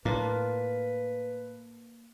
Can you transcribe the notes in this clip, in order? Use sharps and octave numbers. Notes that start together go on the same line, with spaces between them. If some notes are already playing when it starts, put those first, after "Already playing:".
A2 A#3 D4 F4 B4